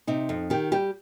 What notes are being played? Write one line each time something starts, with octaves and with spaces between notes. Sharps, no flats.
C3 D#4
F2
D#3 G4
G3 G4